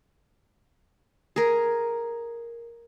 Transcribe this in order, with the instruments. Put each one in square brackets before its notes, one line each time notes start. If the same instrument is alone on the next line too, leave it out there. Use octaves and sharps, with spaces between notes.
[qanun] G#4 A#4